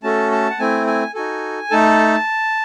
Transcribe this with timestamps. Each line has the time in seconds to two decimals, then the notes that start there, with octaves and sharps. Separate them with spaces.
0.03 A3 C#4 F#4 A4 A5
0.32 A5
0.50 F#5
0.59 A3 C4 E4 G#5
0.87 G#5
1.14 D#4 F#4 A4 G#5
1.71 A3 D#4 A4 A5